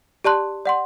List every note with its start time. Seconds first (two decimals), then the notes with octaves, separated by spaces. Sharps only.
0.24 G4 D5 A5 C6 F#6
0.66 D5 F#5 C6